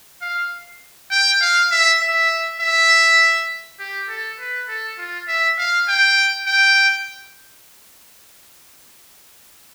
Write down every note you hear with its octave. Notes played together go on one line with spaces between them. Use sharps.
F5
G5
F5
E5
E5
E5
G4
A4
B4
A4
F4
E5
F5
G5
G5